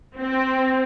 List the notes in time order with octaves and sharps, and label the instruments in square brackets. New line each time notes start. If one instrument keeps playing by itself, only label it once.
[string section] C4